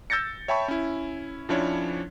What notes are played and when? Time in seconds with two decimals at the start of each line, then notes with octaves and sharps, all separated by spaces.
0.10 E6 G6 A6 A#6 C#7
0.48 C#5 E5 G5 A5 B5 C#6
0.68 C#4 E4
1.49 F2 F3 C#4 D4 E4 C#5